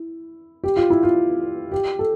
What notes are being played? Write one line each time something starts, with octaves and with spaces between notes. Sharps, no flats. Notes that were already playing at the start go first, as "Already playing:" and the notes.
Already playing: E4
G4
F4
E4
F4
G4
A4